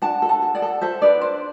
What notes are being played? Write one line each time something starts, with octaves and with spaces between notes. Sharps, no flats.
D4 F#5 A5
A4
F#5 A5
A4
D5 F#5
A4
A4 C5 E5
D4 B4 D5
D4 C5